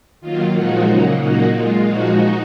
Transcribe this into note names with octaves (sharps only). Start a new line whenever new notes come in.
D#3 F#3 A#3 F4
A#2 F3 G#3 D#4 F#4
C#3 F#3 A#3
A#2 F#3 A#3 D#4 F#4
A#2 G#3 F4
A#2 F3 G#3 D#4 F#4